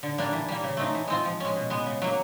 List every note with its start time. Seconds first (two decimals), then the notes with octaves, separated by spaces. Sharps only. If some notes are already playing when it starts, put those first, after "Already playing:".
0.03 D3
0.18 G3 A#3 D4
0.33 E3
0.48 G3 A#3
0.64 C#3
0.77 F#3 A3 C4 D#4
0.94 E3
1.08 G#3 C4 F4
1.25 F3
1.40 G#3 C#4
1.56 B2
1.70 G#3 B3
1.86 C#3
2.02 F#3 A#3